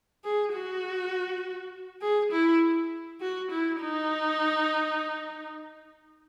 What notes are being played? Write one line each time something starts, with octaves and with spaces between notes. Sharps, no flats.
G#4
F#4
G#4
E4
F#4
E4
D#4